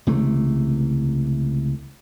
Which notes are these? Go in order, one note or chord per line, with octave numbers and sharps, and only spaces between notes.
C#2 C3 E3 A3